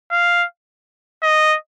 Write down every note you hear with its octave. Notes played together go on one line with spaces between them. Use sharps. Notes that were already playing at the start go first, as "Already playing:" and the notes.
F5
D#5